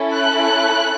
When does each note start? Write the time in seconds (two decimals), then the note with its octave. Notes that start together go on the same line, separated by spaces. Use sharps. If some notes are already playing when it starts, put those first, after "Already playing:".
Already playing: C#4 E4 A4
0.14 F#6